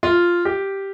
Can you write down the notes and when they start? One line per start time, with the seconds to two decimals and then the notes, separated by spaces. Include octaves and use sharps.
0.03 F4
0.45 G4